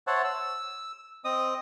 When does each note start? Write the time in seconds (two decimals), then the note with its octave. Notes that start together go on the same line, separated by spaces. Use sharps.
0.07 C5 C#5 E5 F#5 A5
0.24 E6
1.25 C4 D#5 D#6